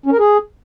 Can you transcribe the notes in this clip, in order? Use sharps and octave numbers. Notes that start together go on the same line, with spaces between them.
C#4
A#4
G#4